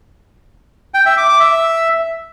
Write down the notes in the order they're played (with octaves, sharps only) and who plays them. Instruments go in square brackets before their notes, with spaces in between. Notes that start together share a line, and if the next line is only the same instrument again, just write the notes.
[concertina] G5
E5
D6
D6
E5